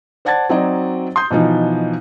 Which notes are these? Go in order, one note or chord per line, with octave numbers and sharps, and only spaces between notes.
C5 D5 F#5 A5 G#6 A6
F#3 C4 D#4 F#4 D5 D#5
C6 D#6 G6
B2 E3 F3 D#4